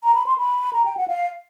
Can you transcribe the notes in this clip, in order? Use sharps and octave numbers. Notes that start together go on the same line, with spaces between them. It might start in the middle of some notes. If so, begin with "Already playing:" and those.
A#5
B5
C6
B5
A#5
G5
F#5
F5